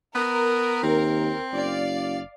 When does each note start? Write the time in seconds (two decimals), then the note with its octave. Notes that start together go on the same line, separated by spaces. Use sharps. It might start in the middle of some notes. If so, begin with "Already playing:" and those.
0.15 B3 A#4
0.83 D#2 C4
1.53 F#1 D5 F5